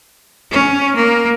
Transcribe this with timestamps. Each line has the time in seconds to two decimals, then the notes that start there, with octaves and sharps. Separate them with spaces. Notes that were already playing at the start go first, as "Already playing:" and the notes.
0.51 C#4
0.96 A#3